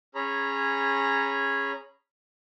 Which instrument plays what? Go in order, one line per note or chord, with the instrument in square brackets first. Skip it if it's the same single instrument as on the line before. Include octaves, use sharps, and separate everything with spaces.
[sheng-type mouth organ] C#4 G#4 C#5 A#5 B5